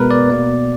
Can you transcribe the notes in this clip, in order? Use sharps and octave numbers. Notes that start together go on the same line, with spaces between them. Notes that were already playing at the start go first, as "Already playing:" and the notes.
Already playing: B2 G#3 B3 A#4 B4
D5
B2 A#3